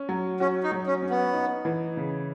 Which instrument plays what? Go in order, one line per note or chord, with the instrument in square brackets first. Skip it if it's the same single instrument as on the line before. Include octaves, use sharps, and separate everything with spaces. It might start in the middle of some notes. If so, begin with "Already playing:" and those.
Already playing: [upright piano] C#4
F#3
[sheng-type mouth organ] C#4 [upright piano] F#4
[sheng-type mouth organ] D#4
[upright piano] F#3
[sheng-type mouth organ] C#4
[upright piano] C#4
[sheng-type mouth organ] B3
[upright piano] D#4
E3
C#3